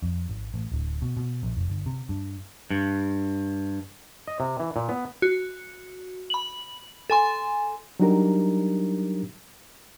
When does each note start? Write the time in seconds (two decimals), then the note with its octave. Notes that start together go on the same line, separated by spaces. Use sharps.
0.02 F2
0.29 G#1
0.54 A1
0.71 D1
1.02 B2
1.17 B2
1.43 A#1
1.57 F1
1.70 G1
1.86 C3
2.09 G2
2.70 G2
4.28 D#5
4.40 C3
4.60 E3
4.76 A#2
4.89 B3
5.22 F#4
6.30 B5 F#7
7.10 A4 G#5 C6
8.00 F#3 G3 D4 D#4 G4 A#4